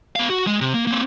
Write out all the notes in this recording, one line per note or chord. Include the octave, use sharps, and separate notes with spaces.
B3 F5
F#4
G#3
C3
A#3
A#3 C4